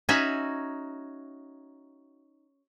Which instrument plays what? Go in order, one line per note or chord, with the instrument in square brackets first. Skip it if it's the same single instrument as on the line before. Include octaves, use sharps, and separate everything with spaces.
[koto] C#4 D#4 F#4 E5